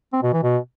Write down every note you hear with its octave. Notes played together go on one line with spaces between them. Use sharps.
C4
B2
E3
B2